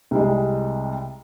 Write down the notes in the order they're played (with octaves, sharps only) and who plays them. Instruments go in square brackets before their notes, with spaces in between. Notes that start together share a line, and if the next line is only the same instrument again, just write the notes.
[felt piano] C2 G3 G#3